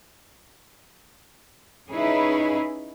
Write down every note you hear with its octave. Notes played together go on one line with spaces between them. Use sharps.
C#4 D#4 E4 G#4 B4